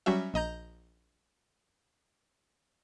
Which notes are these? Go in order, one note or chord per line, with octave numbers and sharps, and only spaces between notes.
F#3 G3 C#4 F#4 E5
A#1 D#5 A#5 G6